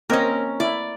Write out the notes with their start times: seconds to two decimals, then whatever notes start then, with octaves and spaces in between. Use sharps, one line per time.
0.10 A#3 C4 C#4 A#4 D#5
0.60 E4 D5